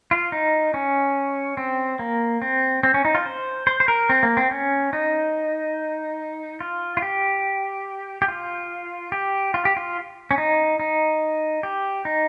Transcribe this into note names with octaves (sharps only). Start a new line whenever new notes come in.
F4
D#4
C#4
C4
A#3
C4
C4
C#4
D#4
F4
C5
C5
C5
A#4
C4
A#3
C4
C#4
D#4
F4
F4
G4
G4
F4
G4
F4
G4
F4
C#4
D#4
D#4
G4
D#4